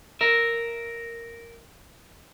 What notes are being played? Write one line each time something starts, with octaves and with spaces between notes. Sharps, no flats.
A#4 E5